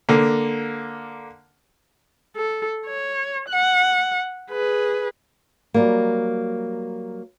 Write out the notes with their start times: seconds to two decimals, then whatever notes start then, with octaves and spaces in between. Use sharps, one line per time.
0.09 D3 A#3
2.36 A4
2.86 C#5
3.48 F#5
4.51 G#4 B4
5.74 F#3 G3 A#3